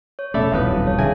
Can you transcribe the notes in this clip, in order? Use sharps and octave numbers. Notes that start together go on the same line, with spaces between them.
C#5
F1 B2 A3 C#4 A4 D5 E5 B5
D#1 B1 F2 A2 B4 F5 D#6
F#3 G3 A5
C#5
D3 G#4 E5 F5 G#5